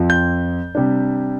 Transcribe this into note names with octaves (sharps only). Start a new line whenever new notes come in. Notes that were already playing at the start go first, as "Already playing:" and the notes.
Already playing: F2 F3 C4
G6
C3 G3 D4